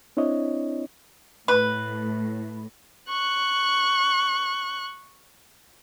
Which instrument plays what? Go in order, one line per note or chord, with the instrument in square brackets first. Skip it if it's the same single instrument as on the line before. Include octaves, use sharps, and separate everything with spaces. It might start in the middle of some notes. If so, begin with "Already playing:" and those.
[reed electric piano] C4 D4 E4 C#5 D#5
[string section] A2 [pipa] B4
[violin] C#6 F#6